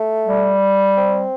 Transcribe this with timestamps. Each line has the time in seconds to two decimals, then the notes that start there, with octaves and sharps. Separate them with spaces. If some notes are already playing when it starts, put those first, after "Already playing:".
Already playing: A3
0.27 G3
0.97 C4